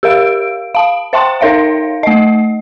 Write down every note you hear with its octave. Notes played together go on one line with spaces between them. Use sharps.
G4 A#4 F5 D7
F5 A5
C5 E5 G5 A5 C6
D#4 A#4 C#5 E5 F5
A3 D#5